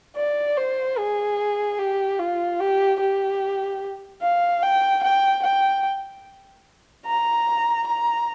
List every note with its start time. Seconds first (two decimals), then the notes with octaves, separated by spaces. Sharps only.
0.16 D5
0.57 C5
0.98 G#4
1.78 G4
2.19 F4
2.60 G4
3.00 G4
4.22 F5
4.63 G5
5.03 G5
5.43 G5
7.06 A#5
7.87 A#5